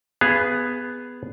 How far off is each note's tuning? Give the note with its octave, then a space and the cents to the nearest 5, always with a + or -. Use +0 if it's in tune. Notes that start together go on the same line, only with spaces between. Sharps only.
B3 +5 G#4 +0 F5 -35